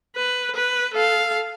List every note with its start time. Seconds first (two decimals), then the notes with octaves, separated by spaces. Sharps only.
0.16 B4
0.56 B4
0.94 A4 F5